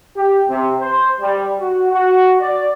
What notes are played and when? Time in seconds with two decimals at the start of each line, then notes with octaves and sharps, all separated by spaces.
0.16 G4
0.48 C3
0.80 C5
1.20 G3
1.58 F#4
1.92 F#4
2.40 D5